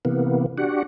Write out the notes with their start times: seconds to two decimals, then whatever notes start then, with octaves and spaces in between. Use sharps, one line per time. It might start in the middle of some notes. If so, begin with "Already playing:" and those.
0.05 C3 E3 A#3 B3
0.57 D4 F#4 G4 F#5